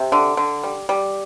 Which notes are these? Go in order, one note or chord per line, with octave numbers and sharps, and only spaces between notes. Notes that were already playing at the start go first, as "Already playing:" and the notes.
Already playing: C3
D3
D3
G3
G3